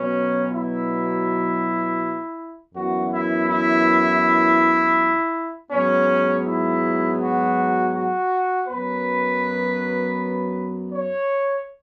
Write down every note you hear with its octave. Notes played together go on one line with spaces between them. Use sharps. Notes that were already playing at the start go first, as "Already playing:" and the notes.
Already playing: B2 F#3 B3 C#4
E4
F#2 E3 B3 F#4
E4
E4
G#2 F#3 B3 C#4
E4
F#4
F#4
F#2 F#3 B3 B4
C#5